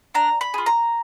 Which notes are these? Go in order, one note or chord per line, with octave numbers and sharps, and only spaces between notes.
D4 A#5
B5
F4 G#4
A#5